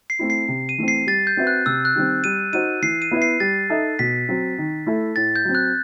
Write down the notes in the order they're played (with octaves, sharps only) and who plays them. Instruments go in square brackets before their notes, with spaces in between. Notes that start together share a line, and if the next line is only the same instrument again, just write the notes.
[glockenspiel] C7
[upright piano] A3 C4 E4
[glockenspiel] C7
[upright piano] C3
[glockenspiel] D#7
[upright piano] E3 A3 C4
[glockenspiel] C7
[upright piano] G3 [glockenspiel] A6
[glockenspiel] G6
[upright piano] C4 F#4 B4 E5
[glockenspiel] F#6
[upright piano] C3 [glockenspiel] E6
[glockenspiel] F#6
[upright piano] D#3 G3 C4
[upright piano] G3 [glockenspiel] D#7
[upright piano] D#4 F#4 C5 D#5 [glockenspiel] D#7
[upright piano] E3 [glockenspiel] C7
[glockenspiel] D#7
[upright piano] B3 E4 B4 E5
[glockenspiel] C7
[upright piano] G3 [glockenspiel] A6
[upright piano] D#4 A4 E5
[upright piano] B2 [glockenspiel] B6
[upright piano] F#3 C4
D#3
A3 E4 A4 E5
[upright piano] A2 [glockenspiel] A6
[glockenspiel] G6
[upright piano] F#3 C4
[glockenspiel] F#6